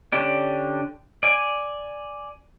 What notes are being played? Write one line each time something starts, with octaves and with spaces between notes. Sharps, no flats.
D3 C#4 D4 G4 D5
D5 G#5